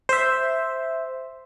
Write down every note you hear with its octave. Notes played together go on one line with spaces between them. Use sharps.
C5 E5